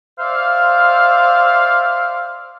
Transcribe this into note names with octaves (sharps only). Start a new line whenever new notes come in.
C5 D5 E5 F5